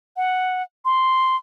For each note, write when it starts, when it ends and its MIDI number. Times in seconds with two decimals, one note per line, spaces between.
0.17 0.63 78
0.85 1.36 84